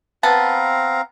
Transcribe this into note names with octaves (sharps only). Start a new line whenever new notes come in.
B3 C4 F5 A5 A#5